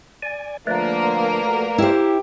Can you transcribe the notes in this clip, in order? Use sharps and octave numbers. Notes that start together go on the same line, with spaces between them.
D5 G#5
D3 F3 A3 A#3 A#4 B4 D5
F3 F#4 A4
E4 G4 C5